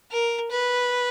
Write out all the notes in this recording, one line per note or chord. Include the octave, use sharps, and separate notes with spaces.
A#4
B4